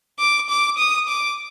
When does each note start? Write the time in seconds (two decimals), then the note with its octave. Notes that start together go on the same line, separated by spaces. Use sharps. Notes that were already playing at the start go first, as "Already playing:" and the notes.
0.19 D6
0.49 D6
0.78 D#6
1.08 D6